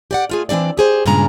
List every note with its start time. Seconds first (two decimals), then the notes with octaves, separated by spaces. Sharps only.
0.11 G4 D5 F#5
0.29 A3 F4 G#4
0.49 E3 A#3 C4 D4 D5
0.77 G4 G#4 C5
1.06 G2 A#2 C#3 G#3 D4 A#5